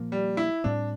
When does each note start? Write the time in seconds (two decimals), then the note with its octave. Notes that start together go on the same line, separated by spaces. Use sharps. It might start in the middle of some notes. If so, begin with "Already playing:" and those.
Already playing: A#2 F3 A#3
0.12 G3
0.37 E4
0.64 A2 G3 C4 D4